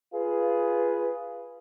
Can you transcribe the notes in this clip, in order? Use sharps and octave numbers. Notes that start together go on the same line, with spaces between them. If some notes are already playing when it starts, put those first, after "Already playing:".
F4 G#4 B4